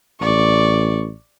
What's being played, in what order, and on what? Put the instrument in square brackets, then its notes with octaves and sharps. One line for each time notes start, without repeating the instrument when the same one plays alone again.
[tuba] A1 [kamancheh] D5 C#6